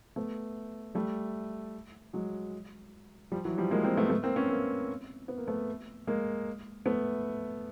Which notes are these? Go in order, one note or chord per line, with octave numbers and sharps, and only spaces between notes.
A3 B3
G3 A3
F#3 G#3
F3 G3
E3 F#3
F3 G3
G#3 A#3
A#3 C4
A3 B3
A3 B3
A#3 C4
B3 C#4
A#3 C4
B3
A#3
A3 B3
G#3 A#3
A3 B3